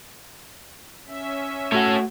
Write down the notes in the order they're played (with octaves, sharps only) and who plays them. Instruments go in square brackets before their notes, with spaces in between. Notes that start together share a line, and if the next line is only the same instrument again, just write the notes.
[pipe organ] C#4 E5
[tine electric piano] A3 F#4 F#5 [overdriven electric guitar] A4 C#5